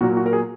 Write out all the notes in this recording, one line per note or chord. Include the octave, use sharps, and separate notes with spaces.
A#2 F#3 A#3 F#4
F#4
A#4
G#4